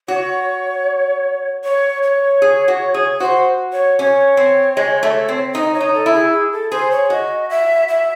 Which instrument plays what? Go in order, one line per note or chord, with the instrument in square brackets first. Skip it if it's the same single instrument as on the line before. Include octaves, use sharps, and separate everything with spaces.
[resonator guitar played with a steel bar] F#4 [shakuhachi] C#5
[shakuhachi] C#5
C#5
[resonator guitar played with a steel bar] G#4
F#4
G#4
[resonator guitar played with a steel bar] F#4 [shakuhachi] C5
[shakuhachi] C#5
[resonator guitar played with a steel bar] C#4 [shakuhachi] C#5
[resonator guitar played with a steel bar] C4
G#3
A3
C4
[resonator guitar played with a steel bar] D#4 [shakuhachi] D#5
[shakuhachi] C#5
[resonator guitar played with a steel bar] D#4
[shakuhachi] A4
[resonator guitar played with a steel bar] E4
[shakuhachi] G#4
G#4
A4
[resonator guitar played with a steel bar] G#4 [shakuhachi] C5
[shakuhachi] C#5
[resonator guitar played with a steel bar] F#4 [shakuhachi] D#5
[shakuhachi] E5
E5